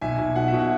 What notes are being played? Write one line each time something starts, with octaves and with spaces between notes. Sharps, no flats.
B1 E5 G#5
B1
B2 F#5
E5
B2
F#5